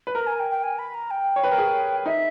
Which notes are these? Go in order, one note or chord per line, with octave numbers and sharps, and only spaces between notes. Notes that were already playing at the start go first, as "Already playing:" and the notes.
B4
A#4 A#5
G#5
G5
G5
G#5
B5
A#5
G5
C#5
B4
A#4
G#4
D#4 E5